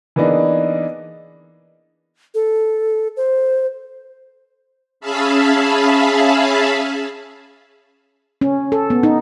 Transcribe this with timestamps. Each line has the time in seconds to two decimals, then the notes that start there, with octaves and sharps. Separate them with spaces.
0.16 E3 A#3 B3 D4 D#4 G#4
2.34 A4
3.17 C5
5.01 C#4 G#4 E5 F5 A5 B5
8.41 C#4
8.72 A4
8.90 B3
9.03 D#4